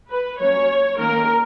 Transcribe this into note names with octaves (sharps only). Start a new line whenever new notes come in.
B4
F#3 A#3 C#4 C#5
D#3 A#3 C#4 A#4